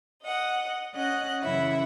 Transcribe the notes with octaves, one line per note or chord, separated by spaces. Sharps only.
D#5 F#5
C#4 D#5 F#5 F#6
F#2 C#3 E3 E4 E5 F#5